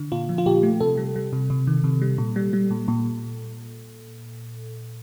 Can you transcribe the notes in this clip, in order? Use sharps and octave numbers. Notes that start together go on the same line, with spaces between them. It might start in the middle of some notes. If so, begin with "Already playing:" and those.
Already playing: D3
A#2 F4
F3
F4
A#2 G4
A3
C3 A4
G3
G3
C3
C3
D#3
C3
G3
A#2
G3
G3
A#2
A#2